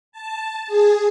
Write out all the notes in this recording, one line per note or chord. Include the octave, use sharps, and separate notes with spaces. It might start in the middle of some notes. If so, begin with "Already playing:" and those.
A5
G#4